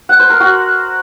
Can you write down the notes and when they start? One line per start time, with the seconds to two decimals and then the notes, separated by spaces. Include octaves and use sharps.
0.09 F#5
0.20 C5
0.30 A#4
0.40 F#4